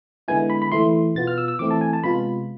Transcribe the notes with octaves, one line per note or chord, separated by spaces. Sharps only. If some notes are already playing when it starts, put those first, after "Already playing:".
D3 G#3 B3 E4 G#5
B5
B5
E3 A3 E4 C6
B2 B3 F4 A6
F6
E6
E6
E3 A3 C4 E4 D6
A5
G#5
A5
C3 G#3 B3 F4 B5